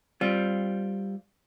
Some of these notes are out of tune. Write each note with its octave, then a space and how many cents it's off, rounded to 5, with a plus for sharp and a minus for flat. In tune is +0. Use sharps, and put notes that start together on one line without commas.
G3 +0 C4 +0 F4 +0